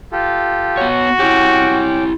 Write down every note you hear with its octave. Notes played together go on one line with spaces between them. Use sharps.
F4 G4 A4
B3 F#4 C#5
C#4 E4 G4 G5 D6